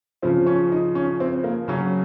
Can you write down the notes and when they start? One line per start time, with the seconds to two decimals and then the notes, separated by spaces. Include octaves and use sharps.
0.22 C#3 F3 C4
0.46 C#4
0.72 D#4
0.95 C#4
1.20 C4
1.44 A#3
1.68 C#3 F#3 C#4